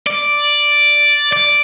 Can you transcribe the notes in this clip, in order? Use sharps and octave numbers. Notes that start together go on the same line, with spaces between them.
D5
D5